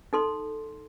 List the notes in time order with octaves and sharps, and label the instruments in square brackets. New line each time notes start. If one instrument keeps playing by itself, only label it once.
[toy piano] D#4 A4 C6